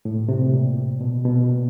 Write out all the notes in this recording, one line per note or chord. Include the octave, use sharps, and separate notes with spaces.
A2
C3
A#2
B2
B2
A#2